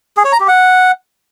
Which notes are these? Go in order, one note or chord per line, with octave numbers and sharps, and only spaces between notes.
G#4
C#5
A#5
G4
F#5